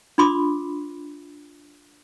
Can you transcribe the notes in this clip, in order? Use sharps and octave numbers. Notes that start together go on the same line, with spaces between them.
D4 F4 B5 C6 D6 D#6